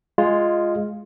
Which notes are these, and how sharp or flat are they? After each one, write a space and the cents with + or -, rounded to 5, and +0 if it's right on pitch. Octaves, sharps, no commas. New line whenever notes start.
G#3 +0 F4 +0